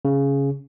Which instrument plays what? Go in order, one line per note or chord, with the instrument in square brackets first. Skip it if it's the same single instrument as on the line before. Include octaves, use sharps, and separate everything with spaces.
[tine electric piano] C#3